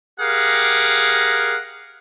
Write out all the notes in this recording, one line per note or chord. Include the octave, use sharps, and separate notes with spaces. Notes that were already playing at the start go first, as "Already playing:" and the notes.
G4 G#4 A#4 F5 F#5